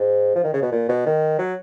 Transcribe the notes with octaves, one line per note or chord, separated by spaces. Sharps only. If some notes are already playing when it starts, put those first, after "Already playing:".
Already playing: G#2
F3
D#3
C#3
B2
A#2
B2
D#3
F#3